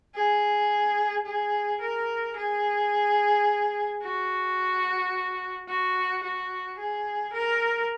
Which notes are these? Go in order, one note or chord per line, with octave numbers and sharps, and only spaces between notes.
G#4
G#4
A#4
G#4
F#4
F#4
F#4
G#4
A#4